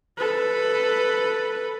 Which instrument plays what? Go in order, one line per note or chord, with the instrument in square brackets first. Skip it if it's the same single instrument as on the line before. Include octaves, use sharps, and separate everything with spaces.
[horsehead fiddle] A4 B4